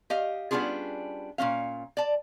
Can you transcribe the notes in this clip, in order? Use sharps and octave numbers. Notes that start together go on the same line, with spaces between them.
G4 D#5 F5
G3 B3 C#4 D4 F4 G#4
A#2 G#3 C#4 F5
D5 A5